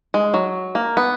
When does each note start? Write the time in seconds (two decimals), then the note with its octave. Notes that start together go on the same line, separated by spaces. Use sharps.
0.14 G#3
0.34 F#3
0.75 A#3
0.97 B3